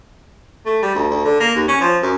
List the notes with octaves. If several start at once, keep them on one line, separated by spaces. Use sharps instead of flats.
A3
G3
D2
D2
D3
A#3
D#2
C#4
F3
F#2